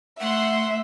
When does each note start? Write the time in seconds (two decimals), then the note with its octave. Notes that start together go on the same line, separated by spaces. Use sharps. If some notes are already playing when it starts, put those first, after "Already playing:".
0.21 A3 E5 F#5 C6